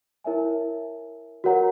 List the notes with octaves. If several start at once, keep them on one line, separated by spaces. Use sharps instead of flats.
E4 A#4 C#5 E5 G#5
F#4 A#4 C#5 F#5 A#5